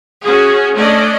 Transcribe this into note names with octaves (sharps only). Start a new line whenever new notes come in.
C#4 F#4 G#4
A3 C#4 D4 D5 D#5